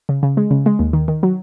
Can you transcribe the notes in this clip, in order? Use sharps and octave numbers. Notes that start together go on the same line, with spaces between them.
C#3
C#3
G#3
C#3
G#3
D#2
D#3
D#3
F#3